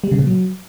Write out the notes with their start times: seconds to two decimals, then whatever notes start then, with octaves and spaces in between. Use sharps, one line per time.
0.04 G3
0.11 C#3
0.19 A#2
0.27 F#3